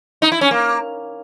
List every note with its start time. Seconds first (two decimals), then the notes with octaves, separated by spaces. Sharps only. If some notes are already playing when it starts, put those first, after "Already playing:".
0.22 D#4
0.32 E4
0.41 C#4
0.51 A#3